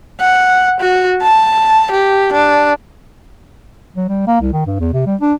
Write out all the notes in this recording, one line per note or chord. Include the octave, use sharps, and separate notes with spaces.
F#5
F#4
A5
G4
D4
F#3
G3
A#3
C2
D#3
G2
E2
C3
G3
D4